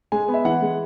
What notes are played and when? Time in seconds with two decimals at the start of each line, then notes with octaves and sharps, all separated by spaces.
0.12 G#3 G#5
0.28 B3
0.34 E5
0.45 E3 F#5
0.62 G#3